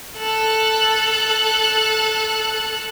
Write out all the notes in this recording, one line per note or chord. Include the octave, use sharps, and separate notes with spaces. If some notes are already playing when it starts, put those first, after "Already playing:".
A4 F#6